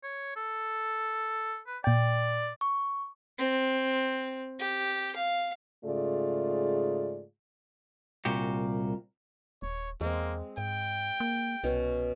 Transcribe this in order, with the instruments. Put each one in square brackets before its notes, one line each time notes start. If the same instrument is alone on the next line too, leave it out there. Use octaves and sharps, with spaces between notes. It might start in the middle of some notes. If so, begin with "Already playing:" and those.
[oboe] C#5
A4
B4
[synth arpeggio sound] A#2 G5 [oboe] D5
[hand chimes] C#6
[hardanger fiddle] C4
G4
F5
[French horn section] G#2 C#3 A3 F4 G#4 D5
[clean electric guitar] C2 A#2 F#4 G4
[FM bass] D#1 [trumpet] C#5
[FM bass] E2 [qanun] G#3 C4 [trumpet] A#3
[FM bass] G#2 [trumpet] G5
[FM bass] A#3
[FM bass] C2 [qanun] B2 C#4